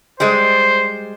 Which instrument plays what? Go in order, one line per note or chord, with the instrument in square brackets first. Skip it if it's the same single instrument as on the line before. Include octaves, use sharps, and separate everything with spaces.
[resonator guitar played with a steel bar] G3 G#3 [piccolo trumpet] C5